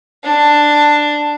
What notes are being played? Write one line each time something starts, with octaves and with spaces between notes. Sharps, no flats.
D4